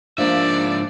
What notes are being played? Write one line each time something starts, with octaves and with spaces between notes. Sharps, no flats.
G#2 F3 A#3 D4 G#4 D5 E5